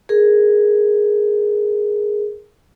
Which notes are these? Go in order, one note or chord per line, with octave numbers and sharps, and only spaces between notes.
G#4 A#4